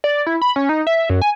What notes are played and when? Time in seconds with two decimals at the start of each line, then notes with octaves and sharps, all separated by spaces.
0.04 D5
0.27 E4
0.42 B5
0.56 C#4
0.69 D#4
0.87 E5
1.10 F#2
1.22 G#5